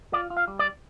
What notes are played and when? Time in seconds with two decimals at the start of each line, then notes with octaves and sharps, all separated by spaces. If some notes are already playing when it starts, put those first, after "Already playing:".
0.13 F4 D5
0.30 F4
0.37 F5
0.48 G3
0.59 D5